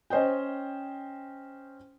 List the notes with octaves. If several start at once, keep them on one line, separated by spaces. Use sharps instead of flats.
C#4 C5 D#5 G5